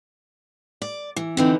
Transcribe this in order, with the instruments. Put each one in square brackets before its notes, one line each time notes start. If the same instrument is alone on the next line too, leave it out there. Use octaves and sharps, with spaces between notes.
[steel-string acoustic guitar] D5
E3
[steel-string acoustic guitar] D3 E3 D#4 [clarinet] C4